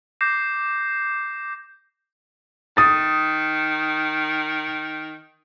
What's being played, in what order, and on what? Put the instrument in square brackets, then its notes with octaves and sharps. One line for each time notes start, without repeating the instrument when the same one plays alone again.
[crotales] D6 G6 A#6 C7 E7
[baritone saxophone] D#3 [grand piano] D#6 A6